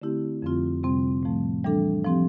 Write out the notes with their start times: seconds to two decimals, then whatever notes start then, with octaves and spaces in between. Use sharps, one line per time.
0.02 D3 A3 C4 E4 G4
0.42 F2 D3 F3 C4 F4
0.83 F2 C3 G3 C4
1.23 A2 F3 A3
1.64 E3 G3 D4 A4
2.04 F3 C4 G4